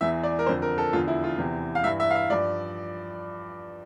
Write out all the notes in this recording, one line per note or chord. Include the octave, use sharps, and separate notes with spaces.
E2 E3 E5
D5
A#4
F2 D3 F3 C5
A#4
A4
E2 D3 F3 F4
E4
F4
E2 C3 E3
F5
G2 E3 E5
E5
F5
E5
G2 F3 D5